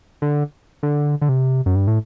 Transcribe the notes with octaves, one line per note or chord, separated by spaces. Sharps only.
D3
D3
D3
C3
F#2
G2
A2